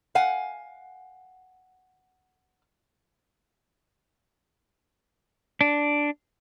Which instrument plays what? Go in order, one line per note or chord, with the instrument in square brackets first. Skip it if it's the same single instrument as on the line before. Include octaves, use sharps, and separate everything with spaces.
[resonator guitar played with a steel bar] F5 F#5 G#5
[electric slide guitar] D4